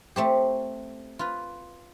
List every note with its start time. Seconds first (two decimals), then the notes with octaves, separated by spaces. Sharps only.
0.16 A3 C4 G4
1.19 F4 B4